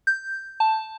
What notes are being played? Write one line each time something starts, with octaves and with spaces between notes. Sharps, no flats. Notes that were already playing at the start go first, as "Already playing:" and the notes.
G6
A5